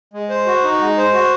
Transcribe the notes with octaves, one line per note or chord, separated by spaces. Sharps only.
G#3
C5
F#4
D#4
G#3
C5
F#4